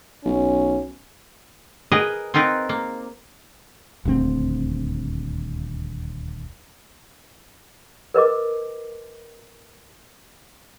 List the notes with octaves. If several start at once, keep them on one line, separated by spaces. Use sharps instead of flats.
B1 C#4
G#4 A#4 B4 D#5
C4 D#4 F4 A#4 B4
A#3
D#1 D2 G3 C4
A#4 B4 D#5 D6